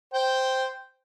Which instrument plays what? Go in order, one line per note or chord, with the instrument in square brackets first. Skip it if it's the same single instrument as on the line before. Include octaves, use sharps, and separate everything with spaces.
[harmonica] C5 G5